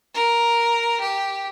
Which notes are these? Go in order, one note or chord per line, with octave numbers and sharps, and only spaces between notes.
A#4
G4